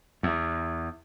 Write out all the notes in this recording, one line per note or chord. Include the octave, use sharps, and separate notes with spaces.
E2